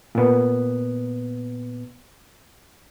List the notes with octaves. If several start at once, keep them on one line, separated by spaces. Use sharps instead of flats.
A#2 B3